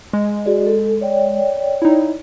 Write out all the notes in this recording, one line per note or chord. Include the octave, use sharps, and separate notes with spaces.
G#3
F#4 G#4 D5
A4
C#5 D5 G5
D#4 E4